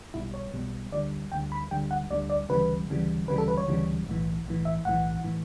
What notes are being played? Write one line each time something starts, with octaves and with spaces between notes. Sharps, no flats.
B1 B2 G3 E4
C#5
B1 B2 G3
D2 D3 G3 D5
D2 D3 G3 G5
B5
D2 D3 G3 G5
F#5
D2 D3 G3 D5
D5
D2 C#3 E3 G3 B4
D2 C#3 E3 G3
D2 C#3 E3 G3 B4
A4
B4
C#5
D2 C#3 E3 G3
B1 A2 E3
B1 A2 E3
E5
B1 A2 E3 F#5
A2 E3